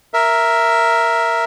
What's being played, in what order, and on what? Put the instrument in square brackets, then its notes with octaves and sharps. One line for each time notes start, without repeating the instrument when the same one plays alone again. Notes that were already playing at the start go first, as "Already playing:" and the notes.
[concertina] A#4 E5